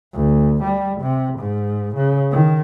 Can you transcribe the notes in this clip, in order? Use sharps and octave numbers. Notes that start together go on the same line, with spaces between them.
D2
G3
C3
G#2
C#3
D#3